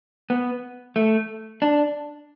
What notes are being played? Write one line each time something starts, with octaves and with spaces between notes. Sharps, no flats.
B3
A3
D4